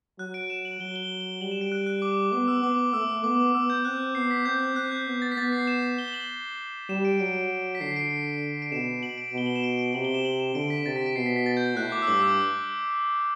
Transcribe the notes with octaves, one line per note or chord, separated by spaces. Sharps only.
F#3 F#6
D7
E7
F#7
F#3 G7
G7
G7
G3 F#7
E7
D7
F#6
F#6
D6
B3 D6
E6
B3 D6
D6
A3 E6
B3 D6
D6
B3 E6
G6
C4 F#6
B3 C7
B6
C4 G6
C4 F#6
G6
B3
A6
B6
B3 A6
C7
E7
E7
G7
E7
F#7
G3 E7
D7
F#3 D7
B6
D3 C7
C7
D7
D7
B2 E7
F#7
D7
B2 G7
F#7
E7
D7
D7
C3 F#7
G7
E7
F#7
E7
D3 D7
B6
C3 A6
B6
D7
B2 C7
B6
B6
A6
G6
A2 F#6
D6
E6
G2 D6
E6